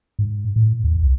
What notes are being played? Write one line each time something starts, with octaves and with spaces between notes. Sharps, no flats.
G#2
A2
D#2
C2